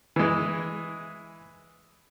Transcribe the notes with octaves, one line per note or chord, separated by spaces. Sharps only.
E3 G#3